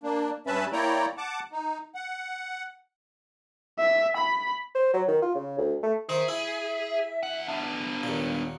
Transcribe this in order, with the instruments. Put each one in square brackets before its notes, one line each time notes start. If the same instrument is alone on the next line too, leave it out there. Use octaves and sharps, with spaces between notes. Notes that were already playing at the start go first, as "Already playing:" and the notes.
[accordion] A#3 D4
G2 C#4 B4 E5 A5 B5
A#3 E4 C#5 D5 G5 A#5
F#5 A5 D6
D#4
F#5
[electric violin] E5
B5
[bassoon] C5
F#3
D#3
F4
C#3
D2
A3
[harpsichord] D#3 C5 [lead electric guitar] G#4 [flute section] E5
[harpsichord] E4
[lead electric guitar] D2 F#5
B3 D4
[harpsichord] D#2 A#2